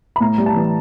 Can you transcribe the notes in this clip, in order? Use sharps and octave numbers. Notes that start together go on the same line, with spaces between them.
B5
A2 A#5
G3
A5
E3